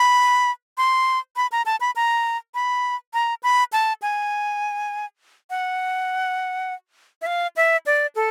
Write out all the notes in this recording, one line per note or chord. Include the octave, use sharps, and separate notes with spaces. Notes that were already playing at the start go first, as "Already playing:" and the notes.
Already playing: B5
C6
B5
A#5
A5
B5
A#5
B5
A#5
B5
A5
G#5
F#5
E5
F5
E5
D5
A4